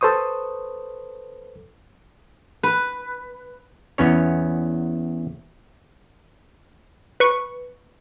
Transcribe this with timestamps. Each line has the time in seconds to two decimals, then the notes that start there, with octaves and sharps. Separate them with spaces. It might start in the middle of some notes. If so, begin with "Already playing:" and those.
0.01 A4 B4 C5 C#6 D#6
2.63 B4
3.98 E2 B3 C#4 C#5
7.20 B4 C#6